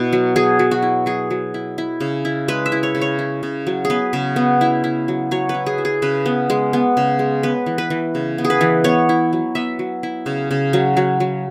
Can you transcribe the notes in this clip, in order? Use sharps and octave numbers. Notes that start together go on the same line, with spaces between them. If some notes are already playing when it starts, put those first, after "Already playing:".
Already playing: B2 E4
F#3
F#3 G#4
F#3
F#4
E4
F#3 G#4
F#3
E4
E4
C#3
E4
G#3 B4
E5
E4
C#5
C#3
C#5
E4
C#3
F#3
G#4
B3 B4
C#3
B3
E4
E4
F#3
F#3 C#5
B4
E4
G#4
E4
G#4
C#3 B4
B3
G#3
B3
C#3
G#3
B3 B4
E3
B4
E3
C#3
B3
G#4
B4
E3
B3 C#5
E4
F#3
B3 E5
F#3
E4
C#3
C#3
F#3
F#3
F#3